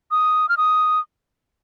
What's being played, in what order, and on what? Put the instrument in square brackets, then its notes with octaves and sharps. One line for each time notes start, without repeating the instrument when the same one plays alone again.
[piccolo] D#6
F6
D#6